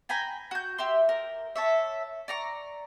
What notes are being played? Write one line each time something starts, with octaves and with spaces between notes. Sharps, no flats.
G5 G#5 A#5 B5
F#4 G6
G4 E5 C6
A#4
A4 C#5 E5
D5 A#5 C#6